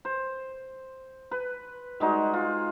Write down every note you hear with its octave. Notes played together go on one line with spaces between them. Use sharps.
C5
B4
G3 G#3 D#4 F#4
F4